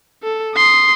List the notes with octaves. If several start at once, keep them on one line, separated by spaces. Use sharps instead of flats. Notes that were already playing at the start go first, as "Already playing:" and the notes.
A4
C6 D#6